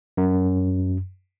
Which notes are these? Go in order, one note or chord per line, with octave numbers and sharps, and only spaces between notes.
F#2